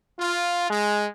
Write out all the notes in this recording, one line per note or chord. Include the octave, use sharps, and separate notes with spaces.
F4
G#3